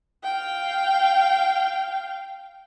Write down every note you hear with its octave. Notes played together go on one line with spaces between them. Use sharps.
F5 G5